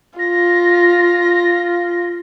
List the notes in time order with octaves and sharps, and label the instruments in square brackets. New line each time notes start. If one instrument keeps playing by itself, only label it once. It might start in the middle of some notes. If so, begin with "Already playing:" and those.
[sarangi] F4 [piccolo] A#6